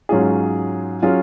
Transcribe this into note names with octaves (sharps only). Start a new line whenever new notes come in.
G#2 F#3 C#4 F4 G#4
F#3 C#4 F4 G#4